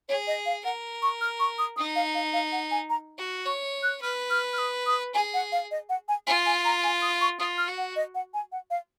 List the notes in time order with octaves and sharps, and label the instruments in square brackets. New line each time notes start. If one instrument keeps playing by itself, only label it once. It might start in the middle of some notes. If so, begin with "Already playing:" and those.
[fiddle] G#4 [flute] C#5
[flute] D#5
F5
[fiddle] A#4 [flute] F#5
[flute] C#6
F6
C#6
D#6
[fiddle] D#4 [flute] D#6
[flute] F5
F5
F5
F#5
G#5
A#5
[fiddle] F#4
[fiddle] C#5 [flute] C#6
[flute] F#6
[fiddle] B4 [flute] F6
[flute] F6
F6
D#6
D#6
[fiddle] G#4 [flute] G#5
[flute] F#5
F5
D#5
F#5
G#5
[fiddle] F4 [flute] G#5
[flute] G#5
A#5
G#5
D#6
C#6
[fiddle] F4 [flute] D#6
[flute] F6
[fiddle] F#4
[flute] F#5
D#5
F#5
G#5
F#5
F5